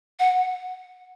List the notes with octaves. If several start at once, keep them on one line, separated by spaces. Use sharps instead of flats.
F#5